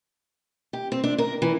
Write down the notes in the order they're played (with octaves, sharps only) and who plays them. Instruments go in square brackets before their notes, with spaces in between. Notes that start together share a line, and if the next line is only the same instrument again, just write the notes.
[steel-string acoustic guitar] G4
C4
D4
A#4
E3